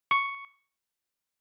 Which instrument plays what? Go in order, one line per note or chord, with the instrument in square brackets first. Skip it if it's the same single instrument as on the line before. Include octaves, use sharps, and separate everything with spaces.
[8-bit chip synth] C#6